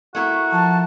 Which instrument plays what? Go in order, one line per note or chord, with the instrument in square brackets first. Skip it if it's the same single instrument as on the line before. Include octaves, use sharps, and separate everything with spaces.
[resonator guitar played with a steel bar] A3 E4 A#4 [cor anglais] F#4
[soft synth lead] F3 [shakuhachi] A5